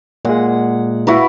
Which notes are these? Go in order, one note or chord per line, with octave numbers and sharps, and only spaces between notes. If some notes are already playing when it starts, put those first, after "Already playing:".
A#2 G#3 F#5
E4 F#4 B4